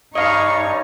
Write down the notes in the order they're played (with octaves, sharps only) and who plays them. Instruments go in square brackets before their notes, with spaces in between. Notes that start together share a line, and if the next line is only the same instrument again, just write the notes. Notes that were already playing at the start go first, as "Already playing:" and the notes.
[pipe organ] G2 C#5 [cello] D#4 [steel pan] D#5 F5 [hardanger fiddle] C#6